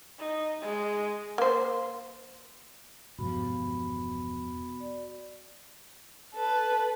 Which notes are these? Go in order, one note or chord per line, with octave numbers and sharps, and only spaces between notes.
D#4
G#3
A#3 C5
E1 G2 F3 B3 F#4 B5
D5
A4 B4